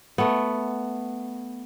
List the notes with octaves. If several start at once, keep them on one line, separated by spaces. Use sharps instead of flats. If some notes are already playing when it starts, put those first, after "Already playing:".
A3 B3